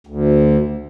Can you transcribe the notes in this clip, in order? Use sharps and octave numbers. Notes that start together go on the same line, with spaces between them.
D2